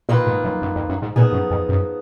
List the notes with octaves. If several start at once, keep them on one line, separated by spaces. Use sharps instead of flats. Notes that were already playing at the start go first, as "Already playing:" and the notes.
A#2 D#3 A#3 F4 B4
G#2
F#2
F#2
F2
F#2
G#2
A#2 F3 B3 D#4 G#4
F#2
F2
F#2